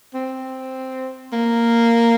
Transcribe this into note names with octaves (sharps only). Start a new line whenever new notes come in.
C4
A#3